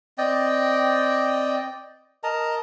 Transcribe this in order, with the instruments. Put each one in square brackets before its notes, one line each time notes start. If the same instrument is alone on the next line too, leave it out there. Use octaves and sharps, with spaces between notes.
[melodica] C4 D5 D#5 G5
A#4 D#5 A5 A#5